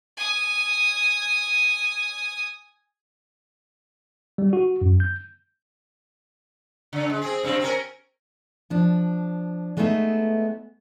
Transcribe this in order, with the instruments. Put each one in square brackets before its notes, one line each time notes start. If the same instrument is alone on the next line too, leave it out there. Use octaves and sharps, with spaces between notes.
[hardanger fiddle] G#5 D#6
[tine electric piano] G3
F#4
F#2
G6
[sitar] C#3
G#3
C4 G#4
G2 C3 C4
C4 C#4 A#4
[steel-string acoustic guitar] F3 D4
G#3 A3 B3 D#4 D#5 E5